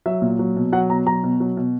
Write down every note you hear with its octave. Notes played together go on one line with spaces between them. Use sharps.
F#3 E5
A#2
F#3
B2
F#3 F#5
B2 A#5
F#3 A#5
B2
F#3
B2